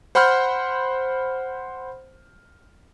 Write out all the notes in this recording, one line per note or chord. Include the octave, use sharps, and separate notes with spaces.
C5 F#5 B5 C6 F6 G6